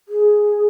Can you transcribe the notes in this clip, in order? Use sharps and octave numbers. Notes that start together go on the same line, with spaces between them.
G#4